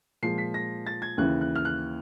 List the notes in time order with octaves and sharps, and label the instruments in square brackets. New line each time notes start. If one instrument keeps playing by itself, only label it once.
[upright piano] A#2 F3 G#3 C7
B6
A#6
A6
G#6
D#2 C#3 E3 F#6
F#6
F6
F#6